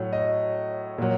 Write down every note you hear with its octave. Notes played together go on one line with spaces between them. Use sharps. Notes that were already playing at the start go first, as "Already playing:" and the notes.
Already playing: A2 F#3
D#5
A#2 F#3